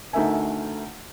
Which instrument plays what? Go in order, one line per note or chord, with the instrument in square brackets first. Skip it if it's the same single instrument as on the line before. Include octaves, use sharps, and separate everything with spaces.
[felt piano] D2 A3 D#4 A#4 E5 G#5